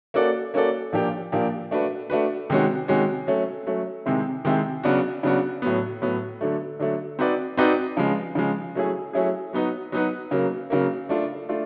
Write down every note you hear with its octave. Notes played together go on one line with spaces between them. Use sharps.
A#3 C#4 F#4 A4 D5
A#3 C#4 F#4 A4 D5
A#2 F3 A#3 D4 G4
A#2 F3 A#3 D4 G4
A3 D4 F#4 B4
A3 D4 F#4 B4
C3 D#3 G#3 C#4 F#4
C3 D#3 G#3 C#4 F#4
F#3 A3 C#4
F#3 A3 C#4
C3 D#3 G#3 C4 E4
C3 D#3 G#3 C4 E4
C#3 F#3 B3 D4 F#4
C#3 F#3 B3 D4 F#4
A2 F#3 B3
A2 F#3 B3
D3 F#3 A3
D3 F#3 A3
C4 D#4 F#4 B4 D5
C4 D#4 F#4 B4 D5
C#3 F3 G#3
C#3 F3 G#3
F#3 A3 C#4 E4 G#4
F#3 A3 C#4 E4 G#4
F#3 B3 D#4 F#4 B4
F#3 B3 D#4 F#4 B4
C#3 F#3 A#3
C#3 F#3 A#3
A3 D4 F4
A3 D4 F4